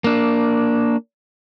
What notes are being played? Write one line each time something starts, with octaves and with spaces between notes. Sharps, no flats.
A#3 D4